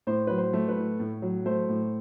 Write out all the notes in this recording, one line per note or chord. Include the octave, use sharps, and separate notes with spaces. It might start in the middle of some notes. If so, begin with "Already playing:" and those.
A2 C5
F#3 B4
C5
A3
B4
A2
A2
F#3
A3 C5
A2